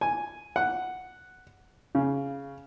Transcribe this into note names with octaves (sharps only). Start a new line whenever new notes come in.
G#5
F#5
C#3